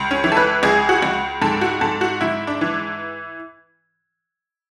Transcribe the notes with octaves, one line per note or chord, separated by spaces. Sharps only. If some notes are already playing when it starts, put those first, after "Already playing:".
Already playing: C#2
C#4
E3
A4
B4
C#2 G#4
F#4
C#2
G#2 A4
F#4
G#2 A4
F#4
G#2 E4
D4
E3